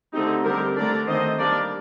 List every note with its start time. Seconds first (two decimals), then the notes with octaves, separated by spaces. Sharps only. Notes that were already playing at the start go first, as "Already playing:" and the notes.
0.14 D3 A3 C4 D#4 G4
0.45 D3 G3 C4 G4 A#4
0.76 D3 A3 D4 A#4 D5
1.07 D#3 A3 C4 C5 D#5
1.39 G3 A#3 D4 A#4 D5